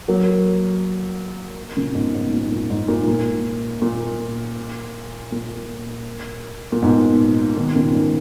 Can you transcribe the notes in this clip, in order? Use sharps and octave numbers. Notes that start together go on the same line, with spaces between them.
F#3 A#3
A#2 C#3
G#2 B2
G#2
A#2
A#2
G#2
A#2
A#2
A#2
A#2
A#2
G#2 B2
B2 D#3
A#2 C#3
G#2 B2